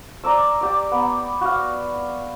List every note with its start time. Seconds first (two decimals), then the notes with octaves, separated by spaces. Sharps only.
0.24 D5 A#5 D6 E6
0.61 G4 D5
0.92 B3
1.41 F#4 F5